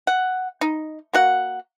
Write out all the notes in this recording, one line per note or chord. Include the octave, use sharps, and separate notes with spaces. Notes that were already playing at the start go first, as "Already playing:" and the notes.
F#5
D#4
A#3 F#4 F#5